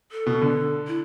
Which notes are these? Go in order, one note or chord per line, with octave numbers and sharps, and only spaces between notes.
A4
B2
D3
E4